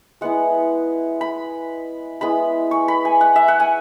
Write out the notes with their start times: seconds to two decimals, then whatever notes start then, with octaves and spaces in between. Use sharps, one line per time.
0.21 G#3 B3 E4 F#5
1.21 B5
2.21 G#3 B3 E4 B5
2.71 C#6
2.88 B5
3.05 G#5
3.21 F#5
3.36 E5
3.48 F#5
3.60 G#5